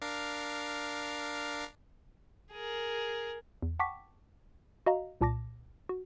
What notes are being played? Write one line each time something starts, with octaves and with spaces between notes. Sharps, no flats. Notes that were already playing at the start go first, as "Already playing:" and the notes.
D4 A#4 F5
G#4 A#4
E2
F#5 G5 A5 C#6 D6 B6
F#4 D#5 F5 A#5
C2 A#2 A5 D6 A#6
F#4